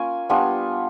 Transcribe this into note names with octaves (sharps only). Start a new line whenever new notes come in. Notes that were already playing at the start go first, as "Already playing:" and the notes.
Already playing: A#3 C#4 F4 G#5
G3 B3 D4 F4 G#5